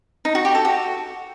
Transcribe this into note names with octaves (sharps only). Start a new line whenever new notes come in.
D#4
F#4
G4
A4
F#4